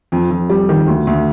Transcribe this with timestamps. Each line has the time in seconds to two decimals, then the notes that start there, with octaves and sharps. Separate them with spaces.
0.12 F2
0.31 F2
0.50 G3
0.69 D#3
0.87 D2
1.07 D2